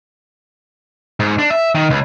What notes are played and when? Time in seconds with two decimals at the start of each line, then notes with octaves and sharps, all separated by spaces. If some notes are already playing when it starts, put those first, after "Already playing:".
1.20 G#2
1.39 D4
1.50 E5
1.75 D#3
1.90 C#2